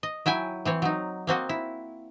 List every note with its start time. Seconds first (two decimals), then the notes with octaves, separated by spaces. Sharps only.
0.03 D#5
0.26 F#3 E4 G5 G#5
0.65 E3 C4 C#5
0.82 F#3 D#4
1.27 A#3 C4 F#4 D#5
1.49 E4